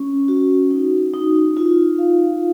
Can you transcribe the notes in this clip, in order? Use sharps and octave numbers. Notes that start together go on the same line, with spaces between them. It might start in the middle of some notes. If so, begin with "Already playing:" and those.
Already playing: C#4
F#4
D#4
D#4
F4
F5